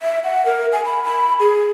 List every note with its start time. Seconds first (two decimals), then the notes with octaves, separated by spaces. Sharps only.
0.02 E5
0.24 F#5
0.46 A#4
0.73 G#5
0.85 B5
1.04 B5
1.40 G#4